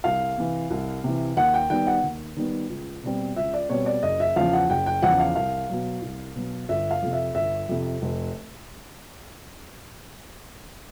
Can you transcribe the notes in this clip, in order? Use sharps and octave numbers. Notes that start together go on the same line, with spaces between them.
C2 F5
C3 E3
C2
C3 E3
D#2 F#5
G5
D#3 G3 B3 G5
F#5
D#2
D#3 G3 B3
C#2
B2 G3 C4
C#2 E5
D5
B2 G3 C4 C#5
D5
F#1 D#5
E5
E2 C#3 F3 F5
F#5
F#1 G5
G5
E2 C#3 F3 F#5
F5
C2 F5
B2 F#3
C2
B2 F#3
G1 E5
F5
F2 C3
E5
G1 E5
F2 C3
F1